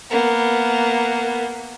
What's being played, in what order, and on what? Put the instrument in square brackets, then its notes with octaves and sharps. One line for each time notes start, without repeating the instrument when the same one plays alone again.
[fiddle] A#3 B3